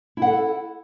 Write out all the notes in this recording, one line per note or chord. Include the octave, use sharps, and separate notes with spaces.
E4 A4 F#5